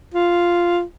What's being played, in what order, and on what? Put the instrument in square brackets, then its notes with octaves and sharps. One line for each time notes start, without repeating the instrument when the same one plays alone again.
[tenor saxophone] F4